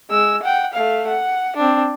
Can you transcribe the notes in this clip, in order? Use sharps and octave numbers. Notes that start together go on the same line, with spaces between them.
G#3 E6
F#5 G5
A3 F5
F#5
C4 D4